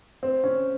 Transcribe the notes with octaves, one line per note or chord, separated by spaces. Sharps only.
C4
C#4